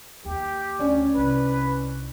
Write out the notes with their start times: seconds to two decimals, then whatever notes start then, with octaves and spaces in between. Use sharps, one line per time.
0.25 D#2 G4
0.79 D2 C#4 D4 D5
1.14 C2 B4